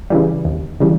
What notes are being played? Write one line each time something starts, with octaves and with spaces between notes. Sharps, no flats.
C#3 E3 G3
D#2
C#3 E3 G3